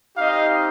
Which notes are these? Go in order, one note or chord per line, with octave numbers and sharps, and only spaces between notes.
C4 D#4 G4 D#5 F5